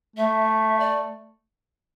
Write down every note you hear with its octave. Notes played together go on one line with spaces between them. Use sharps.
A3 E5
D5